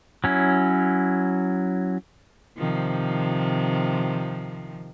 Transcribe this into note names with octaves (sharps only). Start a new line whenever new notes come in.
F#3 C#4 E4
C3 D#3 F3